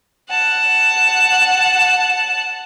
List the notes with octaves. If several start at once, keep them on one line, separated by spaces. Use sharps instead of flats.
F#5 A5